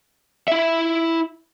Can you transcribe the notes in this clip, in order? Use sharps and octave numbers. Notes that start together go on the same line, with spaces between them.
E4 E5